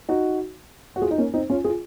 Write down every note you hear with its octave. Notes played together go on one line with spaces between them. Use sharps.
D#4 F#4
F#4
F4 G#4
D#4
A#3 C#4
C4 D#4
C#4 F4
F4 G#4